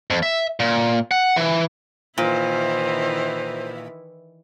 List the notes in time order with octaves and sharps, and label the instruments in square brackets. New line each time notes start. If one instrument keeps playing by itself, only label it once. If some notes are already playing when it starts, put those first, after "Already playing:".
[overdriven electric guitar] F2
E5
A#2
F#5
E3
[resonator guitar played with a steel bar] A#2 [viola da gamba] D#3 E3 E4 [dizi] C5